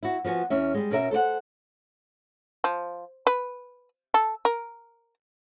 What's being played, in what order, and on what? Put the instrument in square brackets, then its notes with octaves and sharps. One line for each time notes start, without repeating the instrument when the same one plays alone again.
[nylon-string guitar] E4 F#4
F3 B3 F#4 G#5
E2 C#4 E5
G3 G#3
B2 C#4 D#4 A#4 D#5 E5
A4 C5 C#5 F#5
[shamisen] F3
B4
A4
A#4